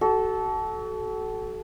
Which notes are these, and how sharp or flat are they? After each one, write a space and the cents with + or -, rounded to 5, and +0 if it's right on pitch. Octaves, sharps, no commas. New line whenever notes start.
F#4 +35 A4 -15